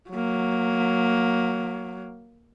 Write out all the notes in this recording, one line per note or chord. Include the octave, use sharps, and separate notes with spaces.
F#3 A#3